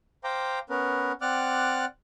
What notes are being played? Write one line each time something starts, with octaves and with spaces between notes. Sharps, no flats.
C5 F5 G5 A#5 D6
B3 C#4 A#4 B4
C4 D5 F#5 D6 F6 F#6